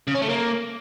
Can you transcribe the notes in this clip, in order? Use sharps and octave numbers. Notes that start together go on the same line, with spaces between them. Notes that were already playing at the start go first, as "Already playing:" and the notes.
C#3
C#4
A3
A#3